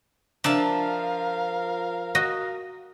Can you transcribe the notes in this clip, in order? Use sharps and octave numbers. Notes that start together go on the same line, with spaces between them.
F3 D4 A#4 E5 F5 A5
F#4 D#5